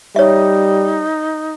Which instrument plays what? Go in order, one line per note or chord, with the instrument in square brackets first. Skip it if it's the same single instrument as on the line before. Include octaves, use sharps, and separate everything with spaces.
[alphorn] G3 [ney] D#4 [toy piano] C#5 E5